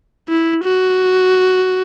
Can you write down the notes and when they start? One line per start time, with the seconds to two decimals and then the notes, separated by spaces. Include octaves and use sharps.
0.29 E4
0.64 F#4